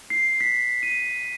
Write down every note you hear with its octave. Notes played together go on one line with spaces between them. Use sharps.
C7
B6
D#7